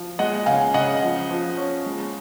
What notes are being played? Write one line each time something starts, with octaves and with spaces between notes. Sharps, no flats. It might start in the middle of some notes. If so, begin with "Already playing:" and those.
Already playing: F3
G#3 D#5 F#5
C#3 F5 G#5
C#3 D#5 F#5
F3
F3
C#4
G#3